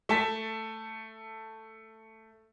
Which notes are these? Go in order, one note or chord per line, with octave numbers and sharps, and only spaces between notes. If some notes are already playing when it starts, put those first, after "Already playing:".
A3 A5 B6